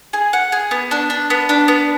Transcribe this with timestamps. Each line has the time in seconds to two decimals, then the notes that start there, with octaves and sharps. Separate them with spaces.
0.13 G#4
0.33 F#5
0.52 G#4
0.71 B3
0.91 D4
1.10 D4
1.30 B3
1.49 D4
1.68 B3